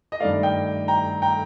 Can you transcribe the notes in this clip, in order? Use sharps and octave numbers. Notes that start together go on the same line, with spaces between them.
D#5
G2 D#3 A3 D5 F5
D#5 G5
G5 A#5
G5 A#5